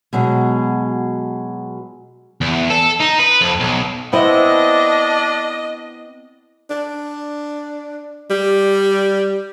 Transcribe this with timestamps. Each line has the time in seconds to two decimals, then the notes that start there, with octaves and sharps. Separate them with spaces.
0.13 B2 F#3 G#3
2.41 E2
2.70 A4
3.01 D#4
3.20 B4
3.41 F2
3.60 B1
4.13 B3 C4 D4 E4 D#5
6.70 D4
8.30 G3